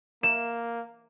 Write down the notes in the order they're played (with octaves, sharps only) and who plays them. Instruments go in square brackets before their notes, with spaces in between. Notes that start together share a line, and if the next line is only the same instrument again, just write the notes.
[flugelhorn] A#3 [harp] E7